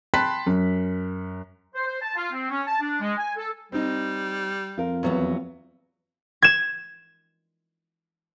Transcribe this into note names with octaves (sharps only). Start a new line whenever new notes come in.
G5 A5 B5 C6 F#6 B6
F#2
C5
C5
A5
F4
C4
C#4
A5
D4
G#3
G#5
A4
G3 C4 D#4
F2 F4 A#4
E2 F#3 B3
G#6 E7